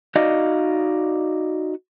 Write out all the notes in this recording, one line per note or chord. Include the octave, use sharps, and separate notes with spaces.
D#4 F#4 D5 D#5 F5